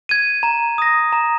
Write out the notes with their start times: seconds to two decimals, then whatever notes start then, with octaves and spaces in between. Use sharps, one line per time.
0.09 G#6 D#7
0.43 A#5
0.78 D#6 A#6
1.13 A#5